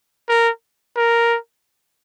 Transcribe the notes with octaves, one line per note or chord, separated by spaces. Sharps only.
A#4
A#4